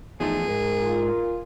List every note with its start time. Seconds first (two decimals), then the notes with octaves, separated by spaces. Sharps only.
0.20 E2 F3 A3 D#4 G#4
0.49 G#2 A#4
0.82 F4